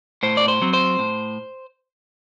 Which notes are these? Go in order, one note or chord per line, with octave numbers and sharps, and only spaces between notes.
A2 C5
D5
C5
F#3 C4
C5
A2